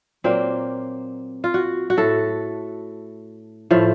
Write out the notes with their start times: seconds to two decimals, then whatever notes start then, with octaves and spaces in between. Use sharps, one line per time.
0.24 A#2 F#3 A#3 C4
1.44 F4
1.54 F#4
1.90 F#4
1.97 A2 A3 A4
3.71 A2 F3 A3